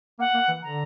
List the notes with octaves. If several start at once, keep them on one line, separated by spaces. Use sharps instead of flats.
A#3 F#5
A#3
E3
D3 A#5